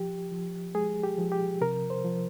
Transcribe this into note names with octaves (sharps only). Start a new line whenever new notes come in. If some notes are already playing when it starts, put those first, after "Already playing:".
Already playing: F3 G4
F3
G#3 G#4
G4
F3
G4
C3 A#4
C5
F3